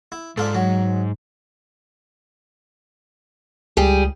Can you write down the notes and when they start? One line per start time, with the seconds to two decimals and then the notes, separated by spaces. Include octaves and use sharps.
0.12 E4
0.38 G#2 D4 F4 A4
0.55 F#3
3.77 C#2 G3 G4 G#4